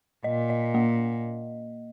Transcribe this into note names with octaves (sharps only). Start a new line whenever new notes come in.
A#2 D#5
D#5
A#3